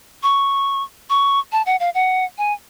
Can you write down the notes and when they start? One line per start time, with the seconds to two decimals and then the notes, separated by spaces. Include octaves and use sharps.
0.23 C#6
1.10 C#6
1.52 A5
1.66 F#5
1.80 F5
1.95 F#5
2.38 G#5